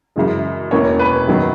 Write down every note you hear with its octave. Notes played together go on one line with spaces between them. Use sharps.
F#2 C#3 E3 G#3
E1 E2 B2 A#3 C#4 C#5
B4
F#2 D#3 F#3 B3